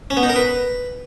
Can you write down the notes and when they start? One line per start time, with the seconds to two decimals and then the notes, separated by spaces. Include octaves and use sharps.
0.10 C#4
0.17 B3
0.23 D#4
0.30 A#4
0.36 B4